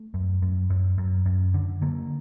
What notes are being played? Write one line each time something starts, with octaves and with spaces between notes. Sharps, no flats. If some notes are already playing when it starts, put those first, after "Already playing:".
Already playing: A3
F#2
F#2
F#2
F#2
F#2
D3
D3 A#3